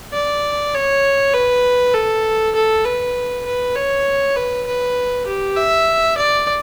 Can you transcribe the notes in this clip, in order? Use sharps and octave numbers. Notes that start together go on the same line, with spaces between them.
D5
C#5
B4
A4
A4
B4
B4
C#5
B4
B4
G4
E5
D5